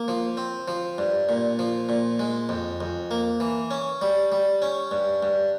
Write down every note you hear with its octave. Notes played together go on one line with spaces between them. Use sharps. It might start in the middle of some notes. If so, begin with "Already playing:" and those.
Already playing: A#3
F3
C4
F3
G2
A#2
F3
A#2
G#3
F2
F2
A#3
E3
C#4
G3
G3
C#4
G2
G2